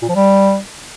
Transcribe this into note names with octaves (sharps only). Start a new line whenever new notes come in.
A#2
F3
G3